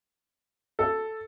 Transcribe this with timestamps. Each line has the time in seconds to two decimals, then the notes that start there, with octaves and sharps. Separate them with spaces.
0.79 A4